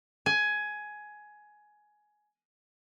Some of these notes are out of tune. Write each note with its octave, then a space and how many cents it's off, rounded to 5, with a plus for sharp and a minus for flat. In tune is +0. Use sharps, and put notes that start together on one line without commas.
G#5 +15